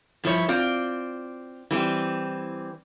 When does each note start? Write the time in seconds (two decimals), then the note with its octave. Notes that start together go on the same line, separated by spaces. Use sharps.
0.24 G2 F3 E4 C#5
0.48 C4 F4 D5
1.71 E3 G3 A#3 C4